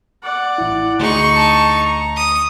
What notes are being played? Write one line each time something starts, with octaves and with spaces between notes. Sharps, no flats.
D5 F#5
A1 E4
D2 D#4 G#4 C6 C#6
A5
A#5
D#6